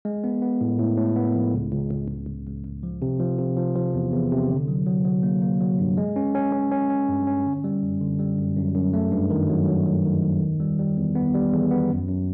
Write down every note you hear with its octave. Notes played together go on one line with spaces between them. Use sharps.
G#3
B3
B3
A2
A2
A2
B3
F3
C#2
C#2
C#2
C#2
C#2
C#2
C#2
F3
C3
F3
C3
F3
F3
E2
E2
C3
D3
F#3
F#3
F#3
A#3
A#3
F#3
G2
G#3
C#4
C#4
C#4
C#4
C#4
G2
C#4
D3
G3
F#2
D3
G3
F#2
F#2
F#2
A3
G2
D#3
F#3
F#3
F#3
D#3
D#3
E2
G3
G3
E2
B3
G3
E2
B3
F#2
F#2